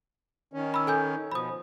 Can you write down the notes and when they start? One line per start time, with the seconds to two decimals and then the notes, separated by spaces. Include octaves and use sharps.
0.53 D#3 C#4
0.74 B5 E6
0.87 A4 G#5 G6
1.32 B2 F3 B5 D#6